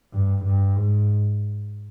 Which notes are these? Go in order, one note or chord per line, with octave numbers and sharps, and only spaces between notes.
G2
G2
G#2